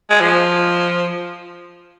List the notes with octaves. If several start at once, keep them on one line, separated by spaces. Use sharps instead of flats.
G#3
F3